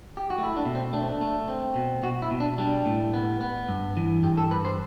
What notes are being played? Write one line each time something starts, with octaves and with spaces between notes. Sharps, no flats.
G4
F#4
A3
E4
D4
B2
C4
A3 D4
C4
D4
A3
C4
B2
B2 F#4
E4
B2
D4
G3 D4
A2
B3
B3
G2
E3
G2 G4
A4
G2 B4
C5